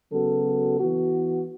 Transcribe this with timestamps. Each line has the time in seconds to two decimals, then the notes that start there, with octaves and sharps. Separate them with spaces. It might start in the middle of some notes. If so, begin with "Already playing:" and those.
0.11 C#3 F#3 B3 F#4 A4
0.80 E3 B3 F#4